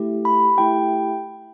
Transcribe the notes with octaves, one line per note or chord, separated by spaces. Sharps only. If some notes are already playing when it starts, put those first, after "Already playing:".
Already playing: A3 E4 G4
B5
A3 E4 G4 G5